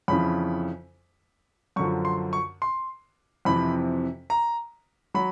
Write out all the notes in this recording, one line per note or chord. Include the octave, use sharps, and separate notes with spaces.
F2 C#3 E3 B5
F#2 D3 F3 C#6
C6
C#6
C6
F2 C3 E3 B5
A#5
F#3 B5